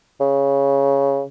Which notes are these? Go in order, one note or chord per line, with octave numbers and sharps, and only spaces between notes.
C#3